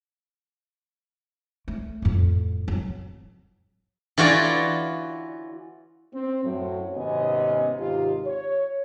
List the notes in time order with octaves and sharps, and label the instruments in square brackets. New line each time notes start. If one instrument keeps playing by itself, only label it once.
[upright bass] A3
F2 A2
F#3
[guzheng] E3 F4 F#4 C#5 D5
[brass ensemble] C4
F#2 A2 F#3
G#1 C3 B3 C#4 D#5 G#5
G#1 C3 D#4 F4 G4
C#5